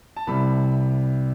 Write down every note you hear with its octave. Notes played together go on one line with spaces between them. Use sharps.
A5
C2 C3 G3 B5